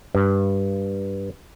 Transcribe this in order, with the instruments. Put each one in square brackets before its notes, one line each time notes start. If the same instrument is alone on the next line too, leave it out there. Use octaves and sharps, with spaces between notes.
[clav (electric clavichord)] G2